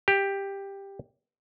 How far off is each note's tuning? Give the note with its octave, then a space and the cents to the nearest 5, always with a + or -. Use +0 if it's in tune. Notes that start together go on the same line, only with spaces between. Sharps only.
G4 +10